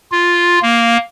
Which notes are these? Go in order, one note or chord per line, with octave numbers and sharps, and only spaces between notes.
F4
A#3